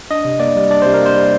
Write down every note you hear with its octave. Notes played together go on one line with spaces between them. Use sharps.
D4 D#5
C3
A#3 D5
G3
D4 D5
C3 C5
A#4
A#3 C5
G3